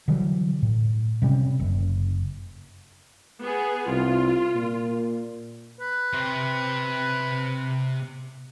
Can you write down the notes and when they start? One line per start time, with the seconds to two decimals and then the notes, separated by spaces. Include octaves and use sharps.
0.08 D3 E3 F#3 G3
0.62 A2
1.22 C3 G3 C4 C#4
1.60 F#1
3.40 B3 G#4
3.87 C2 F4
4.55 A#2
5.81 B4
6.13 C3 C5